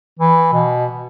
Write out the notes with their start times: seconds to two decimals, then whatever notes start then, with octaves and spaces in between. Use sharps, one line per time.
0.20 E3
0.53 B2